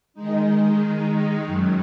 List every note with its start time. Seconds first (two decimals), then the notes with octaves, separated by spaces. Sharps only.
0.14 D#3 G#3 D#4
1.45 F#2 D#3 F#3